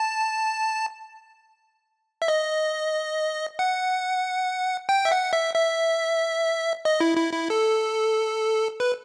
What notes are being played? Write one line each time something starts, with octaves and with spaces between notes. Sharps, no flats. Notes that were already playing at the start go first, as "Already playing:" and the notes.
Already playing: A5
E5
D#5
F#5
G5
E5
F#5
E5
E5
D#5
E4
E4
E4
A4
B4